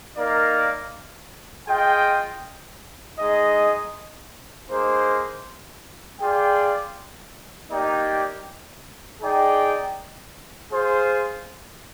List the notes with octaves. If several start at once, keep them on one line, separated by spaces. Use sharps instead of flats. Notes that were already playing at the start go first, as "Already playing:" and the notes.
A#3 D#4 A#4 D5 F5
F4 G#4 D#5 G5
G#3 D#4 G#4 D#5
A#3 D#4 G#4 C5
F4 G#4 D5 G5
A#3 D#4 G4 D5 G5
D#4 G#4 D5 G5
F4 G#4 C5